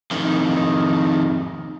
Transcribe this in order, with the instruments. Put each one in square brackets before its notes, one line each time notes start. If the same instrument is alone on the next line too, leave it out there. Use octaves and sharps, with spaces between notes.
[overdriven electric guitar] F2 D#3